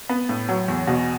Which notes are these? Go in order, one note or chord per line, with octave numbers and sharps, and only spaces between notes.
B3
A2
F#3
E2
B2